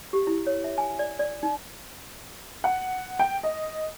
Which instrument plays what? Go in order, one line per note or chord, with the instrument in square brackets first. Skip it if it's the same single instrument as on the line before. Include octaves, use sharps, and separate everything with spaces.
[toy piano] G4
E4
C#5
E5
G#5
D5
D5
D#4
[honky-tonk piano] F#5
G5
D#5